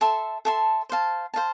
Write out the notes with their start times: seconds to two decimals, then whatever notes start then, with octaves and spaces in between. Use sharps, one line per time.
0.01 A4 E5 A5 C6
0.45 A4 E5 A5 C6
0.89 C5 F5 A5
1.34 C5 F5 A5